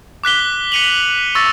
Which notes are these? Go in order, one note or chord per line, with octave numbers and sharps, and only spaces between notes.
D6 F#6 B6 G7
B6 C#7 D#7 F7 F#7
C#6 E6 A6 A#6